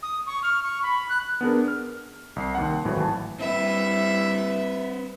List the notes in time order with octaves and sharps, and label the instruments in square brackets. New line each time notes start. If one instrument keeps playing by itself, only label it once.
[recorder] D#6
C#6
F6
C#6
B5
F#6
[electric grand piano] B3 D4 G#4 A#4
F6
C2 C7
D#2 F#5
G#1 A2 E3 F#3
A5
[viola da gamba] G3 [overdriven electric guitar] C4 B4 [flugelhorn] E4 [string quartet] E5